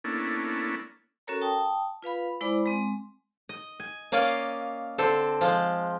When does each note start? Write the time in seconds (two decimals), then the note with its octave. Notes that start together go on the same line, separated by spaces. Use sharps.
0.04 A#3 B3 C#4 D4 E4 A4
1.27 C#4 F#4 A4 A#4 C#5 A#5
1.41 G5 A5 D#6
2.02 F4 B4 F5 B5
2.41 G#3 E4 C5 D5 B5 D6
2.66 G#3 C4
3.49 D#5
3.80 G#5
4.12 A#3 C#4 D5 D#5 F5
4.98 D3 C4 A4
5.41 F3 G#3